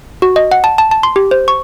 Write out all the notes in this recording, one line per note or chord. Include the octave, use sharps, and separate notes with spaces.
F#4
D#5
F#5
A5
A5
A5
C6
G4
C5
C#6